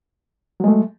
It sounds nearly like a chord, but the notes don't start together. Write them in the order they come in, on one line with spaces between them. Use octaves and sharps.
F#3 G#3 A3